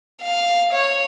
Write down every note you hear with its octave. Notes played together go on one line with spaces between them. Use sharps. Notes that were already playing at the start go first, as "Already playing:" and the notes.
F5
C#5